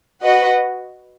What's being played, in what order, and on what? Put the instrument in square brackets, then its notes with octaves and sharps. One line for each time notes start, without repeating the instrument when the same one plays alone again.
[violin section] F#4 B4 D#5 F#5